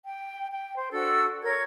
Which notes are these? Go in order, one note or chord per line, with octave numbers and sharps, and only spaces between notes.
G5
G5
C5
D4 F#4 A4 E6
A#4 C#5 G#6